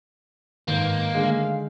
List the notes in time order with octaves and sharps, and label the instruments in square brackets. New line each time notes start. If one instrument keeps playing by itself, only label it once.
[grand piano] G#2 B4 G6 [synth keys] D#3 [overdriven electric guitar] A#3
[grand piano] D3 G#3 [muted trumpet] F5